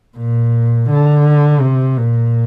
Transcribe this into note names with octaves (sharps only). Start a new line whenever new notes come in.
A#2
D3
C3
A#2